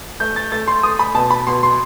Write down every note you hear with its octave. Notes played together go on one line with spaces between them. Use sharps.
A3 G6
A6
A3 A6
C6
A3 D#6
B5
B2 A5
B5
B2 C6
C6